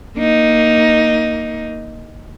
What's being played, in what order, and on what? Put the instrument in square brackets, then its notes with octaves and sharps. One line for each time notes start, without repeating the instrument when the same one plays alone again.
[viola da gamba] A#3 D#4